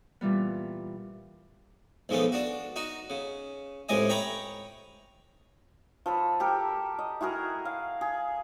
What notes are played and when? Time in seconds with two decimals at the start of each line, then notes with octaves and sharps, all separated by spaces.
0.21 A#2 E3 G3 B3
2.09 B1 F3 G#3 A3 B3
2.32 D4 F#4
2.76 D#4 F#4
3.10 C#3
3.89 C#2 A2 C3 G#3 D#5 G#5
4.09 C#5 G5 A#5 B5 C#6 D6
6.06 F3 A4 B5
6.40 G4 A4 A#4
6.99 D#5
7.21 E4 F#4 G#4 A#4
7.65 F5
8.01 G#4